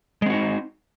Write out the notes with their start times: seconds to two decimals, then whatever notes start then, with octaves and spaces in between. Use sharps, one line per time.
0.22 G#3
0.26 C4
0.30 F#4
0.34 D#4